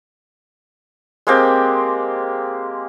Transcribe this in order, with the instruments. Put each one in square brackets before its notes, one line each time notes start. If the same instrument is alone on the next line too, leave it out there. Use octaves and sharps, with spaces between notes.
[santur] G#3 A#3 C4 G4